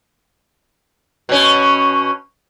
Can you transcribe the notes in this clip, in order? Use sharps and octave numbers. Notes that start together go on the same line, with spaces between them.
B2 C#4